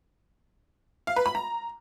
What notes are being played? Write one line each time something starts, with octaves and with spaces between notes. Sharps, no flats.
F5
B4
B5
A#5